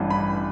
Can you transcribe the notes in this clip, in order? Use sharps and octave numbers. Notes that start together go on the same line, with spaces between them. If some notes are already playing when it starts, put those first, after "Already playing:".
Already playing: A1 G2 E3
B5